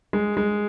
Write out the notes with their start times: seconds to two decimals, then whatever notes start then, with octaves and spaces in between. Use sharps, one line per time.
0.13 G#3
0.37 G#3